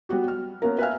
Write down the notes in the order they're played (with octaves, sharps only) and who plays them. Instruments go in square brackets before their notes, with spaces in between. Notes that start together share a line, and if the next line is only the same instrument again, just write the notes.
[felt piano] G3 B3 F#4 G4
F6
A#3 B3 C#4 A#4
B4 E5 F5 G#5 F6